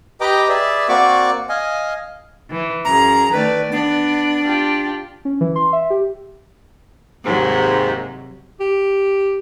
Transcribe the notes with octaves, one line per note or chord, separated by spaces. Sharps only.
G4 B4 D#5 G5 A#5 D6
G#4 B4 D5 E5
A#3 C4 F#4 D5 C#6 D6
D#5 F5 G#5
E3
F#2 G#4 A#5
D#3 A3 B4 D5
B3 D4
F4 G4
C#4
E3
C6
E5
G4
D#2 G#2 C3 F#3
G4